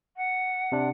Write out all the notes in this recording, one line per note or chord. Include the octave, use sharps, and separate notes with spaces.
F#5
C3 D4